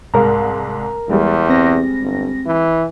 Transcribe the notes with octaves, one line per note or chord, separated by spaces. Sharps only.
C2 G#2 A#4 F5 A#5
E2 G3 G#3
C4 A#6
G1
E3